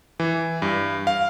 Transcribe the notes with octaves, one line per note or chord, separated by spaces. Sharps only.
E3
G2
F5